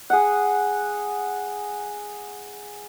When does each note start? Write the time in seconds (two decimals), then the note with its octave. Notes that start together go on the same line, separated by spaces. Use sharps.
0.10 G#4 F#5